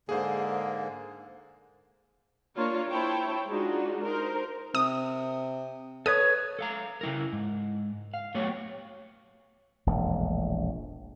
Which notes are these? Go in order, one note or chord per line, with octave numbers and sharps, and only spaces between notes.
G#2 D3 A#3 G#4 C5
A#3 D4 F4 C#5
E4 C5 C#5 G5 A5
G#3 D4 D#4 F4 F#4
D#4 A#4 C5
C3 D#6
A4 B4 C#5 D#6
A4 F5 A#5
C#3 E4 A#4
G#2
F5
F#3 A3 B3 G4 C#5
E1 A#1 A2